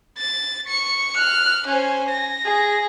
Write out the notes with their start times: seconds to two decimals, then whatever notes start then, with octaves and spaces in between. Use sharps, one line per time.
0.18 A6
0.67 C#6 C#7
1.16 F6 F#6
1.67 C#4 C5 G#5
2.09 A#6
2.45 G#4